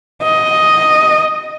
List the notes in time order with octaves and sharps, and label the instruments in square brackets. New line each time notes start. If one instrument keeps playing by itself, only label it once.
[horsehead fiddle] D#5